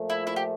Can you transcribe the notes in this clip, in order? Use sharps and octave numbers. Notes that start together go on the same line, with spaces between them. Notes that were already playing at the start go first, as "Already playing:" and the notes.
Already playing: A#2 F3 A3
E4
E4
G4